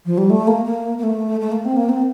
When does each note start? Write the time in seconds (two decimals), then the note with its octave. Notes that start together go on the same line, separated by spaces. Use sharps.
0.06 F3
0.18 G3
0.30 A3
0.47 A#3
0.66 A#3
0.99 A#3
1.03 A3
1.41 A3
1.52 A#3
1.65 C4
1.76 A#3
1.89 C4